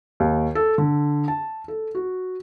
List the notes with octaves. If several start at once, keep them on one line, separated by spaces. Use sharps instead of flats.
D#2
A4
D3
A5
A4
F#4